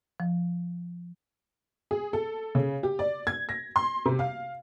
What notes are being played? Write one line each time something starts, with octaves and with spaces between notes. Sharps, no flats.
F3
G#4
A4
C#3
G4
D5
G#6
A#6
C6
C3
F5